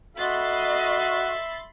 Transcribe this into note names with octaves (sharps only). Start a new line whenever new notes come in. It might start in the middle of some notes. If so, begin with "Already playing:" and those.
F#4 A4 D#5 E5 B5 C6 A6